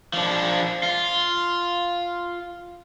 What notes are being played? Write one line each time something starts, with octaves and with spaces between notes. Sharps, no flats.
F3 D4
F4